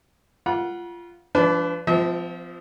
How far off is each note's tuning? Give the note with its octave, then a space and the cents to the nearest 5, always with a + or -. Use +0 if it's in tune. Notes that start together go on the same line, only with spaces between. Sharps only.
F4 -15 F#5 +0 B5 -45
F3 -30 D4 -20 B4 +20
F3 +0 C4 -40 E5 -45